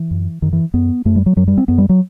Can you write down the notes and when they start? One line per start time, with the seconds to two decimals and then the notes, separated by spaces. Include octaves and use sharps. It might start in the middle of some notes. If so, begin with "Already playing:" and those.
Already playing: E3
0.11 F#2
0.42 F#2 D#3
0.53 E3
0.74 F#2 B3
1.05 F#2 A3
1.16 G3
1.26 F#3
1.36 F#2 F#3
1.48 G3
1.58 C4
1.68 F#2 B3
1.78 G3
1.89 F#3